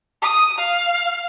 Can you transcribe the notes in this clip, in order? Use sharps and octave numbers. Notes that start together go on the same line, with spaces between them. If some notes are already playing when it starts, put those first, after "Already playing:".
D#6
F5